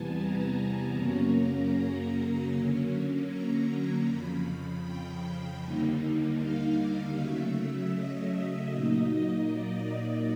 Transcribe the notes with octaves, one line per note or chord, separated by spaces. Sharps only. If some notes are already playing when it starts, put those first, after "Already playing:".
Already playing: E2 C3 E3 G3 B3 G#5 A5
A#5
F#2 C#3 F#3 A#3 C#4
A#5
D3 F#3 A#3 C#4
A#5
F2 C#3 F3 B5
G5
D#2 D3 G3 A#3 D#4
F5
C#3 F#3 A3 E5
D#5
A#2 F#3 A#3 D#4
D5